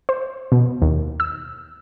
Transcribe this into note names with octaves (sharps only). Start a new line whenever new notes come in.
C5
B2
D#2
E6